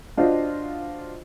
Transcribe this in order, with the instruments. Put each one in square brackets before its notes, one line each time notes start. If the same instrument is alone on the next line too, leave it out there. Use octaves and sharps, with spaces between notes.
[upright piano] D4 F4 F#4 C5 D#5